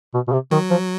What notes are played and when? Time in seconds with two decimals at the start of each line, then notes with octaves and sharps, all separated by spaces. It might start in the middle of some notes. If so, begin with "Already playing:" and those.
0.14 B2
0.28 B2
0.32 C3
0.51 D#3 F#3
0.70 F3